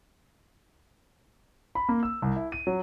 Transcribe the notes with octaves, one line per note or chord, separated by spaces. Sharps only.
B5
A#3
E6
C2
E4
D#7
F#3